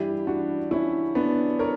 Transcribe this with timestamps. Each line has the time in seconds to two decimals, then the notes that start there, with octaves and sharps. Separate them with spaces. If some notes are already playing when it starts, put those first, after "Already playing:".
Already playing: G2 E3 G3 E4 G4
0.27 D4 F#4
0.71 C#4 E4
1.15 B3 D4
1.59 A#4 C#5